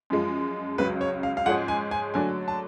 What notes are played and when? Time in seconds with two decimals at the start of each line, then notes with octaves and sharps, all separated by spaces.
0.10 F#2 F3 G#3
0.78 C#2 C#3 F#3 B4
1.01 C#5
1.23 F5
1.37 F5
1.46 G#2 F3 G#3 C#4 G#4 F#5
1.68 G#5
1.91 G#5
2.14 D3 F#3 A3 D4 G#5
2.48 A5